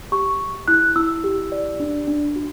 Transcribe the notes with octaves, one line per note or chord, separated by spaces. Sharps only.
G4 C#6
G4
E4 F#6
E4 E6
G4
D5
D4
D4
F#4